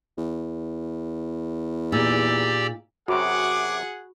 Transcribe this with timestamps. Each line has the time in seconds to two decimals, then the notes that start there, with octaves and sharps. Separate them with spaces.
0.17 E2
1.92 A#2 D#4 G4 G#4 D5 E6
3.08 F#2 C3 F#4 G#4 F#5 B5 C#6 D6